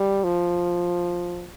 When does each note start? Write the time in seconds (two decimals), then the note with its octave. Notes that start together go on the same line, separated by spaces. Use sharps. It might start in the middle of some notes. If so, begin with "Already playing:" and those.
Already playing: G3
0.24 F3